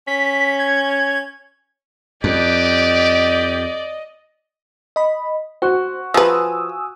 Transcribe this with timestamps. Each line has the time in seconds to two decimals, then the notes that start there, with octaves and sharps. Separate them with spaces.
0.07 C#4 B6
0.59 G#6
2.24 F2 G4 D5 D#5
4.96 D#5 B5
5.62 F#4 C5
6.14 F3 B4 G#5 D#6 E6